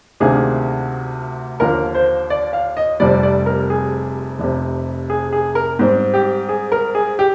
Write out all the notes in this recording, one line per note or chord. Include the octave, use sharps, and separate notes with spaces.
D2 C3 D#3 A#3 D4 G#4
D#2 D3 F3 A#3 A#4
C5
D5
F5
D#5
F1 F2 C3 G3 D5
D5
A#4
G#4
F1 F2 C3
G#4
G#4
A#4
G#2 G3 C4
G4
G#4
A#4
G#4
G4